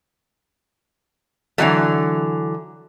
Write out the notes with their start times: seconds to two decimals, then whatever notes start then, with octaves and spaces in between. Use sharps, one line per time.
1.58 D3 E3 F#3 A3